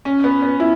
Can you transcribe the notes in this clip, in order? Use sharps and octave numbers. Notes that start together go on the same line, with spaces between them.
C#4
B3
B3
E4